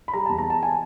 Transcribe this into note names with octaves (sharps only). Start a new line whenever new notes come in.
B5
G3 A#5
E2 A5
A#5
G3 A5
G#5